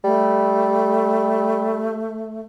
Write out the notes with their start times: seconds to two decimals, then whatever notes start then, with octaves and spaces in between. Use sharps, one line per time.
0.04 G3 A3